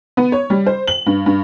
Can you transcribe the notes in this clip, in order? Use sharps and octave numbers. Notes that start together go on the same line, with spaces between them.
B3
C#5
G3
C5
F#7
G2
G2